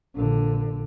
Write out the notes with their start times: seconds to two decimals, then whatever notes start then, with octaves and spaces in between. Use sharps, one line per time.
0.16 A#1 D3